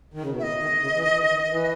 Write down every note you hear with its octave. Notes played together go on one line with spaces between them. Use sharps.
D#3
C#3
B2
A2 E5
D#5
D#3
C#3
E3
D#3
E3
D#3
D#3
E3